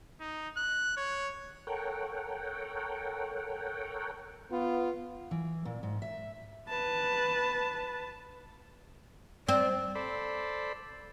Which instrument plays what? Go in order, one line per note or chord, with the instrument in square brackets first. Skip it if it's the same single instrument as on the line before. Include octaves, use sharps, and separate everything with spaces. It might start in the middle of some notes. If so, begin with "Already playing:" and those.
[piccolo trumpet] D#4
F#6
C#5
[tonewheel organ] A4 A#4 C#5 F#5 G5
[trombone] B3 [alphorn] F4
[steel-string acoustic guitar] E3
A#2
G#2
E5
[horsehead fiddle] B4 A5
[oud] C4 [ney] D5
[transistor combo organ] A4 C5 D5 B5